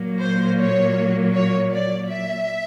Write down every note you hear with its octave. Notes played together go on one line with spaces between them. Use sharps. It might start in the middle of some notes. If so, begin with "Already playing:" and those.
Already playing: A#2 F#3 A#3
C5
C#5
C#5
D5
E5